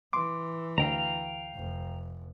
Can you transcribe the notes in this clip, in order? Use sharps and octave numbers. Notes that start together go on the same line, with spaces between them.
E3 C6 D6
D2 F5 G5 A#5
F1